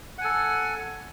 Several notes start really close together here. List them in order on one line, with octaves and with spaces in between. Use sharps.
F#5 G#5 A4